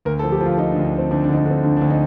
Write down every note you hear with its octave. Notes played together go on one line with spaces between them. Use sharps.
D2 A#4
A4
F3
G4
F3
F4
F3 D#4
D4
D2
D4
D2 C4
D2 D4
D4
D3 D#4
D4
D3 C4
D2 D4
D4
D2
D#4